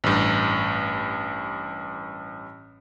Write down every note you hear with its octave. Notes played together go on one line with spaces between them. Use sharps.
A1 G2